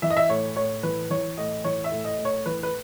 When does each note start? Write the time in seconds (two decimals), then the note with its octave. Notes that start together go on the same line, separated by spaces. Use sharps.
0.02 E3 E5
0.10 D#5
0.17 E5
0.29 A2 C#5
0.56 A2 C#5
0.83 E3 B4
1.10 E3 C#5
1.37 A2 D#5
1.64 E3 C#5
1.84 E5
1.92 A2
2.05 D#5
2.18 A2
2.25 C#5
2.46 E3 B4
2.63 B4